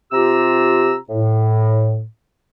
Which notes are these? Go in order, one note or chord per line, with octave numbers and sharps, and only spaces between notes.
C3 F4 G4 A#5 E6
A2